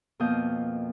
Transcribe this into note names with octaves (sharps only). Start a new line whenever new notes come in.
F2 B2 A#3 F5 D#6 G6